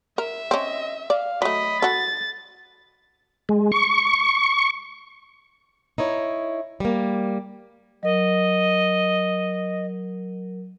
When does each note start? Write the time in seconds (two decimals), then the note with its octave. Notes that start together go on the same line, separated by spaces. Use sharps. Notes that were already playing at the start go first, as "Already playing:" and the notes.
0.18 A#4 E5
0.51 C4 C#4 D#5
1.10 D5 F5
1.42 F#3 A3 D#5 B5
1.82 F#4 A4 A6
3.49 G#3
3.72 C#6
5.98 D#4 E4 C#5
6.80 G3 A#3
8.03 F#3 A#4 D#5